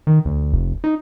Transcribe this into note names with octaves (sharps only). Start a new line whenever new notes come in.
D#3
D2
F1
D#4